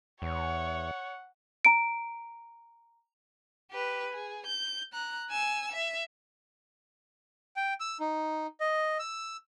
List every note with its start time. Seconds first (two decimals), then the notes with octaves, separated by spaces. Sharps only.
0.22 E2 C#5 F#5
1.65 A#5 D7
3.71 G4 B4
4.12 G#4
4.46 G6
4.93 A#5 F#6
5.30 G#5 E6
5.72 E5
7.56 G5
7.80 E6
8.00 D#4
8.60 D#5
8.99 E6